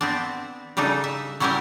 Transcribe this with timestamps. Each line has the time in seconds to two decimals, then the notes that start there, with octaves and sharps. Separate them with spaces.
0.01 B3 C4 D4
0.77 C#3 G3 D4 D#4 A4
1.04 E5
1.40 F#3 G3 C#4 E4 G4 A#4